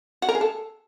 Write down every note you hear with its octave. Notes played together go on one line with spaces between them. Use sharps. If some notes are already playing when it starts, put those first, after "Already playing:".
F#4
A#4
G#4
A4